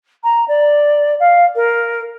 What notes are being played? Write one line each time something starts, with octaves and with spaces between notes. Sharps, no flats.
A#5
D5
F5
A#4